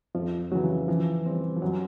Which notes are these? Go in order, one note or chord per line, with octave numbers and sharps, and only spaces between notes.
F2 F3
C#3 E3 F#3
E3 F3
G3 C4
F3
F#2 F#3